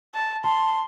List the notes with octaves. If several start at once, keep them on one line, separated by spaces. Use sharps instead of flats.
A5
A5 C6